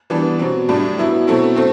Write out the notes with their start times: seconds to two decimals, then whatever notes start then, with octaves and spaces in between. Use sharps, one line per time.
0.10 E3 G3 B3 D4
0.39 B2 F#3 C4
0.69 A2 G3 D4
0.98 F#3 B3 E4
1.27 B2 F#3 A3 C4 E4
1.56 A3 C4